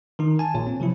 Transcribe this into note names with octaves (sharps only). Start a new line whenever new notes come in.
D#3 D#4
G#5 A5
A#1 A#2 C#5
C4
C3 F3 F#3 E4